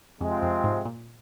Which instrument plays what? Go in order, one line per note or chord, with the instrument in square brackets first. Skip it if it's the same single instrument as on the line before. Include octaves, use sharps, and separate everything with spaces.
[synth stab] F2 [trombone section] C3 F3 G#3 C4 F4
[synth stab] F2
G#2
A#2